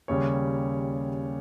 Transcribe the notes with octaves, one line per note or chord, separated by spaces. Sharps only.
D#2 C#3 G3 C#5